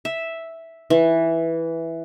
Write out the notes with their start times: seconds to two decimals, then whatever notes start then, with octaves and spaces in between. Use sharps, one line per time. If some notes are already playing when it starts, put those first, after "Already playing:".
0.05 E5
0.90 E3